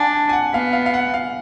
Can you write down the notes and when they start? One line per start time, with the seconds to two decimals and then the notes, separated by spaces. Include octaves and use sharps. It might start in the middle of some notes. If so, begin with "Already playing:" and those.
Already playing: D4 F#5 G#5
0.13 G#5
0.29 G#5
0.33 F#5
0.53 B3 F5
0.73 F5
0.86 F5
0.94 F#5
1.14 F5